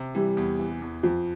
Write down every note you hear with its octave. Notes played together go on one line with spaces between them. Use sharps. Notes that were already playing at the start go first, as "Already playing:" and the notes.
Already playing: C3
E3 G3
E2
E3
E2
F2 F3